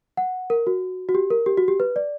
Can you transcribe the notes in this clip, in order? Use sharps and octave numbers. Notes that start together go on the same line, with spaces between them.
F#5
A#4
F#4
F#4
G4
A#4
G4
F#4
G4
B4
D5